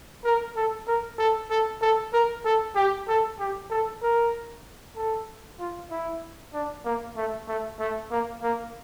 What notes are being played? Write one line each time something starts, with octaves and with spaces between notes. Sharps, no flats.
A#4
A4
A#4
A4
A4
A4
A#4
A4
G4
A4
G4
A4
A#4
A4
F4
E4
D4
A#3
A3
A3
A3
A#3
A#3